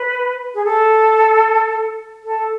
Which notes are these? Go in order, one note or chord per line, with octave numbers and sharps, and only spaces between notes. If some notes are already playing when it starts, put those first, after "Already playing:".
Already playing: B4
G#4
A4
A4